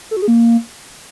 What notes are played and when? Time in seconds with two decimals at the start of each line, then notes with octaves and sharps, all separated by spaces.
0.11 A4
0.17 F#4
0.22 G#4
0.28 A#3